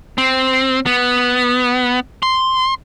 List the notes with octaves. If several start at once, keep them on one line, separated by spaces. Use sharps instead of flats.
C4
B3
C6